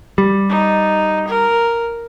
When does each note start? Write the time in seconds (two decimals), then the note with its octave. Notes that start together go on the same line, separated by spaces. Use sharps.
0.18 G3
0.49 D#4
1.27 A#4